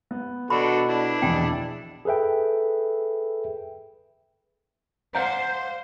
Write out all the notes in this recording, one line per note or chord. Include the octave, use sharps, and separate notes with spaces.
B3
B2 D4 F#4 A4 B5
D4 E4
A#1 E2 B2 G5
G#4 A4 B4 E5 G5
C5 D5 F5 F#5 A#5 G6